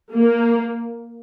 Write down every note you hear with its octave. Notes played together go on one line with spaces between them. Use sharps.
A#3